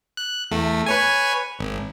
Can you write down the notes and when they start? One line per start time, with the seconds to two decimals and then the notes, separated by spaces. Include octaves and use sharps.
0.17 F#6
0.51 E2 A3
0.86 B4 C#5 G#5
1.59 G#1